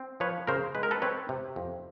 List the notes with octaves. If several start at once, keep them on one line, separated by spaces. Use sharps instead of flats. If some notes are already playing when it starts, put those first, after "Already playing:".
Already playing: C4
F3 B4 C#5
C#3 A#4 C5
G#3 B4
A#4
A4 B4
C4 B4 C#5
C3
F2